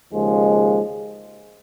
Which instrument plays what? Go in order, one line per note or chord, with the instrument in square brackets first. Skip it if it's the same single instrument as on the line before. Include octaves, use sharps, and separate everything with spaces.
[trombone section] D#2 C#3 F3 G#3